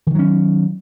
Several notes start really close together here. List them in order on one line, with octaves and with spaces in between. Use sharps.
E3 D#3 F#3 C#4